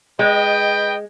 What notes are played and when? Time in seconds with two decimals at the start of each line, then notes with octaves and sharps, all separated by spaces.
0.19 G#3 B4 D#5 G5